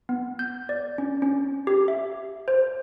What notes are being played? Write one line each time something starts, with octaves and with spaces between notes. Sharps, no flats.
B3
G6
D5
C#4
C#4
G4
E5
C5